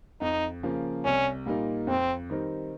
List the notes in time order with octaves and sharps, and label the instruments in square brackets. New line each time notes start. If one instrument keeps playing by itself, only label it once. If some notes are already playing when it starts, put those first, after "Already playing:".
[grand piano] F2 [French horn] D#4
[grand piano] C#3 F3 A#3
[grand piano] C2 [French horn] C#4
[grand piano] A#2 G3 A#3 D#4
[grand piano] F2 [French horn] C4
[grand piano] D#3 G3 C4 D#4